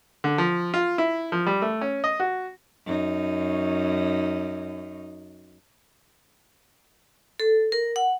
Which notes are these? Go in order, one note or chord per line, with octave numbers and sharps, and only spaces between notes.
D3
F3
F4
E4
F3
G3
A3
C#4
D#5
F#4
F#2 D#4
A4
A#4
F#5